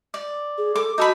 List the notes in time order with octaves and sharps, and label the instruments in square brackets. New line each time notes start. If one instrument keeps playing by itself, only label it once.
[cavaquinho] D5
[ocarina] G#4
[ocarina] A4 [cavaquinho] D6
[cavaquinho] D#4 A4 B5 [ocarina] F#4